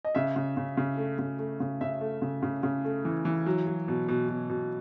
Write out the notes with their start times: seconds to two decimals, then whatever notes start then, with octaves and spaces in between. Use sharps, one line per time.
0.05 D#5
0.15 C#3 E5
0.36 C#3
0.57 C#3
0.77 C#3
0.97 A3
1.19 C#3
1.39 A3
1.60 C#3
1.81 C#3 E5
2.01 A3
2.22 C#3
2.43 C#3
2.63 C#3
2.84 A3
3.05 E3
3.25 E3
3.46 F#3
3.67 F#3
3.88 B2
4.08 B2
4.29 B2
4.49 B2